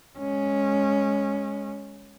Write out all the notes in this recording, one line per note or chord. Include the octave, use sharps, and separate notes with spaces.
G#3 C#4